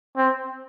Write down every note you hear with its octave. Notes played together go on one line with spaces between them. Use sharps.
C4